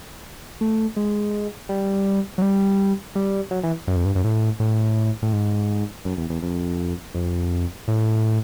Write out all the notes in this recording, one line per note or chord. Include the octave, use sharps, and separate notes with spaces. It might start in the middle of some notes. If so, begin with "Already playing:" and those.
A3
G#3
G3
F#3
G3
G3
F#3
E3
F#2
F2
G2
F#2
A2
A2
A2
G#2
F#2
E2
E2
F2
F2
A2